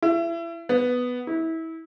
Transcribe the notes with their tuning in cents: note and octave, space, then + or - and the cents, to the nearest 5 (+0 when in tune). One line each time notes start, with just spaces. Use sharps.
E4 +30
B3 +5
E4 -25